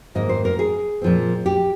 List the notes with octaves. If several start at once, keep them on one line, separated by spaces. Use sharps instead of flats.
G#2 D#3 A#3 D#5
C5
A#4
G#4
A#2 F3 C4
G4